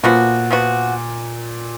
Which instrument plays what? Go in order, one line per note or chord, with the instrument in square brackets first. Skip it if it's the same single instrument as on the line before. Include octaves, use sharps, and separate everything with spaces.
[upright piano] A#2 [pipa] F3 B3 F#4
[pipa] F3 B3 F#4